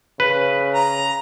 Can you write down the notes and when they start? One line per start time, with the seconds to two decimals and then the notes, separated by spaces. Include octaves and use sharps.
0.20 C#3 B4
0.75 A#5